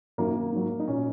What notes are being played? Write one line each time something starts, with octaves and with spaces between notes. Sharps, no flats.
F#2 D#3 F#3 A#3
G#2 F#3
D#4
A#2 F#3 C#4